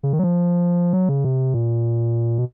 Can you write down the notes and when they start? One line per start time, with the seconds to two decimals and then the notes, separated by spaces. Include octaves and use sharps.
0.03 C#3
0.13 D#3
0.19 F#3
0.24 F3
0.93 F#3
1.09 C#3
1.24 C3
1.54 A#2
2.38 B2